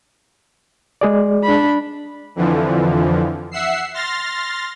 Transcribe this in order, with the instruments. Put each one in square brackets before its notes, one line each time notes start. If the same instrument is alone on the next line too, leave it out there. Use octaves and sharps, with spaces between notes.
[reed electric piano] G#3 G#4 D5
[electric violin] D4 B5
[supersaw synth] F2 D3 E3 F3
E5 F#5 E6 C7
C6 F6 A6 A#6